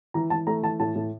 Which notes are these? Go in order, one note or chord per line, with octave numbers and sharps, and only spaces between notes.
E3 A#5
E3 A5
A3 A#5
E3 A5
A2 A5
A2